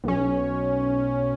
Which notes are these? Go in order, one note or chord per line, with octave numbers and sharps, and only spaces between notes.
B1 C#4